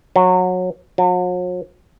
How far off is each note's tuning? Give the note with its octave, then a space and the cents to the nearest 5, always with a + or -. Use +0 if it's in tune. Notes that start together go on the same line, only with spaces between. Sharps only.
F#3 -20
F#3 -45